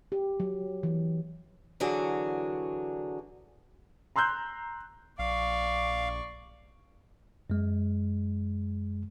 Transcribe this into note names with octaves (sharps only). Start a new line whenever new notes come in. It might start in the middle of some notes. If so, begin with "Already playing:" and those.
G4
F#3
E3
D3 E3 F#3 D4 F#4 G#4
A#5 C6 E6 F#6 G6
A#1 D5 F5 C#6
F#2 G#3